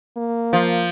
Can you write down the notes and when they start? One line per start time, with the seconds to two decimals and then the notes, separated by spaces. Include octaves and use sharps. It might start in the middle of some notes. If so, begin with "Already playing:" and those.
0.17 A#3
0.53 F3